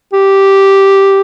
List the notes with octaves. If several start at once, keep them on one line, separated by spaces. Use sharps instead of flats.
G4